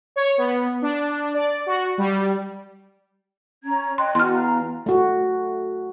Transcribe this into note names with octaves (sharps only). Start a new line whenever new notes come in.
C#5
B3
D4
D5
F#4
G3
C#4 A#5 G#6
D#5 G5 C6 F#6
E2 F#4 C6 F6
F5 A#5
A3 F#4